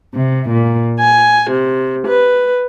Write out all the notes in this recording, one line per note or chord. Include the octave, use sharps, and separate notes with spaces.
C3
A#2
G#5
C3
B4